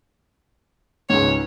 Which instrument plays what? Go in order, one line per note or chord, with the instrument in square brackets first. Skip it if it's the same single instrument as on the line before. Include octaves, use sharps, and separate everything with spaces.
[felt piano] C#2 G#2 [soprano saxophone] C#5